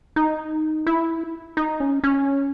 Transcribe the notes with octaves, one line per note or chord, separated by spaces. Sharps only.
D#4
E4
D#4
C#4
C#4